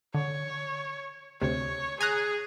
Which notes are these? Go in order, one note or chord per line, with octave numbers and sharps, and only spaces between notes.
D3 C#5
D2 C3 C#5
G#4 G#5 A#5 F#6